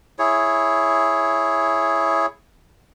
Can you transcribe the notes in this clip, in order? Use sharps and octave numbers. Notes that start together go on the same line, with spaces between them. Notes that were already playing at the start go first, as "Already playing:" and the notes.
E4 G#4 C#5